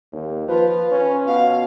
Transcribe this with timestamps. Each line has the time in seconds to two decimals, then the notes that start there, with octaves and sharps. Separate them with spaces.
0.12 D#2
0.48 F3 F4 B4
0.91 C#4
1.27 B2 F5